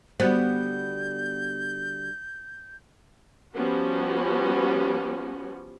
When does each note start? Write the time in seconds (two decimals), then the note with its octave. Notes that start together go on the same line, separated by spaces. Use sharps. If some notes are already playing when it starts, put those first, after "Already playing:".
0.20 D3 G3 B3 F#4 C5 G6
3.55 F3 G3 B3 C#4 F#4